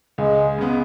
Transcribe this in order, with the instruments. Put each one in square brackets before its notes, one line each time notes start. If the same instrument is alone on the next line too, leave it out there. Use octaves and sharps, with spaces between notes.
[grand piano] C#2 [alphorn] G#3
[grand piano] C#3 G#3 B3